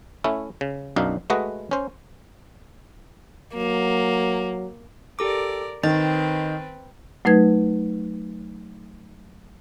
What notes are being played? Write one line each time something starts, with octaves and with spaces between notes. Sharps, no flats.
A3 C#4 E4
C#3
B1 F#2 D4 D#4 F5
G#3 A3 F#4 B4 D#5 F#5
C#4 C5
F#3 A#3
G4 A4 A#4 D5 D6
D#3 C4 B4 A6
F#3 A3 D#4 B4 G#6